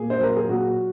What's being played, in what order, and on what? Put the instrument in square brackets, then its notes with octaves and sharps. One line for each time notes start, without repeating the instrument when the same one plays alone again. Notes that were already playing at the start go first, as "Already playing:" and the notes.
Already playing: [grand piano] A#2 G#4
C5
F#3 A#4
G#4
A#2 F#4